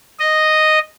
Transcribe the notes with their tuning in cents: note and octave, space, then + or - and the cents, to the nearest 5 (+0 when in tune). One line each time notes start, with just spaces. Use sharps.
D#5 -5